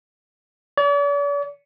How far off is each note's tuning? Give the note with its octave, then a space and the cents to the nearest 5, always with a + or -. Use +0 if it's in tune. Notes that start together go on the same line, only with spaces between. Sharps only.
D5 -45